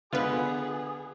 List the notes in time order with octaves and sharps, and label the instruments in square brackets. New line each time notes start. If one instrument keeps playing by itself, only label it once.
[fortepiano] D3 B3 [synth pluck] F4 B4 [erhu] G#4